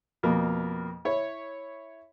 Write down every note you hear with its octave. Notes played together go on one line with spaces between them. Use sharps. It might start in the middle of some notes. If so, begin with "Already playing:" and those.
F2 B2 A#3
E4 C#5